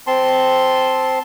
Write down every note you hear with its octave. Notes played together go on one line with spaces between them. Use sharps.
C4 A5 C6